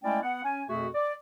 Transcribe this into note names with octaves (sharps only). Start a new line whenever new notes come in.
G#3 A3 C#4 E4 D5 G5
B3 F#5
C#4 G#5
F2 B2 A3 F#4 G#4 E5
D5